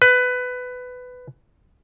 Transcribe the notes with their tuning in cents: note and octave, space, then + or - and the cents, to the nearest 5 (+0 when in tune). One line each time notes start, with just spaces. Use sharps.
B4 +15